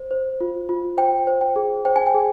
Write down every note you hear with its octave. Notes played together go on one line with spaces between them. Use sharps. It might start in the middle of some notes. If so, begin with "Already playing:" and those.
Already playing: C5
C5
F4
F4
C5 G5
C5
G5
G#4
C5 G5
G#5
G5
G#4